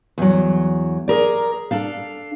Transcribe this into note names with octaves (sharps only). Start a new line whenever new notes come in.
E2 F#3
G#4 A#4 D5
D4 A4 F5